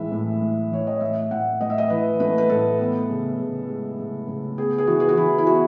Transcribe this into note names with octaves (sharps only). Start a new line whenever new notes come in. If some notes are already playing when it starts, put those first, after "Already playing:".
Already playing: A2 E3 G#3 E5
A2
A2
E3 C#5
D#5
A2 E5
A2 F#5
A2 D#5
E5
D#5
E3 B4
A3 B4
B4
A2 A4
B3
C#3
C#3
G#3
C#3
C#3
B3 G#4
G#4
E3 F#4
G#4
F#4
E3 E4
E4
B3 F#4